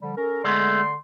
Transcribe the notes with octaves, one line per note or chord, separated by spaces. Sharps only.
D3 F3 G3
C#4 A4 A#4
D3 G#3 A3 B3 D5 C6